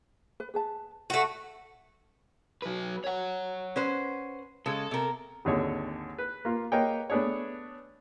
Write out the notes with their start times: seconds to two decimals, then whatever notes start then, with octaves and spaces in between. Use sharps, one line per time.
0.40 B4
0.54 G#4 B4 A5
1.10 A3 F#4 F#5
2.62 F#3 B4
3.04 C#5 F#5
3.76 C#4 B4 C5
4.66 C#3 G#3 A4
4.91 C3 A#4
5.45 G#1 D#2 D3 C#5
6.18 B4
6.45 A#3 F4
6.72 A#3 B4 C#5 D#5 G5
7.10 A3 B3 D4 G#4 C#5